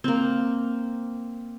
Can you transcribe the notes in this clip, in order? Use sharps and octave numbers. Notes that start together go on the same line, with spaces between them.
A#3 C4